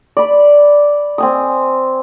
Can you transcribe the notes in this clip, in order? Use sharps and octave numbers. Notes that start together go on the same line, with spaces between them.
D5 B5
C4 G#5 D#6